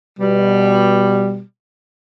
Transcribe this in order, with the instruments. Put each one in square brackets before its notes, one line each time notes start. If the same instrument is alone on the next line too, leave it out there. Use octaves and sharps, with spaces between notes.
[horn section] B2 G3